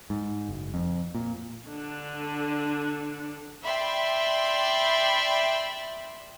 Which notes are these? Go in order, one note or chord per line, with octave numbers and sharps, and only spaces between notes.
G#2
F#1
F2
A#2
D3 D4
D5 E5 G5 B5 C6